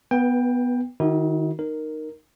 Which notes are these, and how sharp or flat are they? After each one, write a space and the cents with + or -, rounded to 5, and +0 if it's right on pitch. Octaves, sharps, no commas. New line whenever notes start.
B3 +0 B4 -30 G5 +20
D#3 -15 D#4 +45 F#4 +0
D#4 -15 A#4 +0